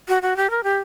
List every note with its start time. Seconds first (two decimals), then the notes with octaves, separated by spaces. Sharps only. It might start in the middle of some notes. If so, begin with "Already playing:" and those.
0.08 F#4
0.22 F#4
0.37 G4
0.50 A#4
0.63 G4